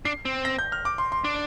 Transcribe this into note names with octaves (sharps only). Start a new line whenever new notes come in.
D4 C7
C4
A#6
G6
F6
D6
C6
C6
D4